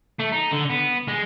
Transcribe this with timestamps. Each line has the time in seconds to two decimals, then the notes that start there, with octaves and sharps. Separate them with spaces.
0.19 A3
0.32 D#4
0.51 D3
0.70 B3
1.08 G#3